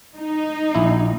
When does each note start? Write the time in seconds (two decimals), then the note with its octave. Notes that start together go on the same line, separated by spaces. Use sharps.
0.17 D#4
0.75 A#1 E4